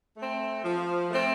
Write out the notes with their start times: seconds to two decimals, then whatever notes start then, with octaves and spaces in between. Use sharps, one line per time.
0.17 A3 C4
0.64 F3
1.10 A3 C4